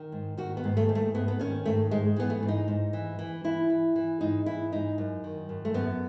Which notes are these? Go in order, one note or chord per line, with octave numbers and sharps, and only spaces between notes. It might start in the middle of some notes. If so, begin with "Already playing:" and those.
Already playing: D#3
G#2
D#3 F#4
B3
G#2
A3
G#2
A3
G#2 B3
B3
D#3 C#4
G#2 A3
G#2 G#3
E3 B3
A3
G#2
D#4
G#2
E3
E3
E3 E4
E3
E3
G#2 D#4
E3 E4
G#2 D#4
F#2
D#3
F#2
A3
F#2 B3